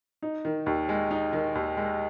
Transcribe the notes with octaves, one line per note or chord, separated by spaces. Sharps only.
D#4
D#3
D#2
G#3
D#4
D#3
D#2
G#3